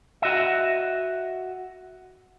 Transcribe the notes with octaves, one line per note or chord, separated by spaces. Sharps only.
F#4 D#5 E5